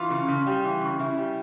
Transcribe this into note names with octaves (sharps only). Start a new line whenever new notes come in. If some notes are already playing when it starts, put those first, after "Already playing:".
Already playing: E3 F4
C#3
C#3
G3
E3
C#3
C#3 E4
G3